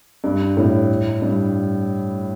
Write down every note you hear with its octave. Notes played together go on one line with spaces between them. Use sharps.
G2
A2
G2